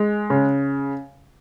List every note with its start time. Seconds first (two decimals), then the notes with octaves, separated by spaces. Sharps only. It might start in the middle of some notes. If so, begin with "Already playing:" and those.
Already playing: G#3
0.30 C#3